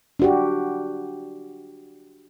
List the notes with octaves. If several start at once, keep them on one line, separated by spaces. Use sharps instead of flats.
D4 F#4 G4